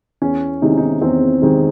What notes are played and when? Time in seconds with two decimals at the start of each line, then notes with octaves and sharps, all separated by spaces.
0.22 E2 C#4
0.62 C3 D#3 G#3 D#4
0.70 C#4
0.77 D#4
1.02 E2 C4
1.42 C3 D#3 G#3